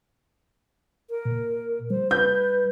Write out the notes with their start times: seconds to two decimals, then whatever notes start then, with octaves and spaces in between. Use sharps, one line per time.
1.10 A#4
1.25 A#2
1.90 G3 C5
2.11 B4 G6